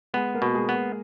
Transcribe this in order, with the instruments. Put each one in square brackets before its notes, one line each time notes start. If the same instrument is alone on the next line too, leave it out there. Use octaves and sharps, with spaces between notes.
[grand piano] G#3 G#4 [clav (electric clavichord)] B3
[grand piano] A#3 A#4
[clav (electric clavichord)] B2
[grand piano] G#3 G#4
[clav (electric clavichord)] B3